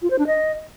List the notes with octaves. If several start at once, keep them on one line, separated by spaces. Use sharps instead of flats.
F4
C5
D4
D#5